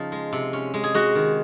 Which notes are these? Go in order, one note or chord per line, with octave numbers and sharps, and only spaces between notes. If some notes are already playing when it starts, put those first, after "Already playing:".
Already playing: C#3 F3 D#4
G#3
C3
C#4
G#3
G#4
G#3 F#4
D#3